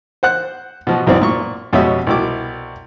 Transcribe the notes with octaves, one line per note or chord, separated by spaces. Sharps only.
C5 F#5 F#6
B2 F3 F#4
B1 F#2 E3 C4 D5
A#2 C#6
F2 B2 G#3 C#4 G4 E5
C2 B2 E4 D6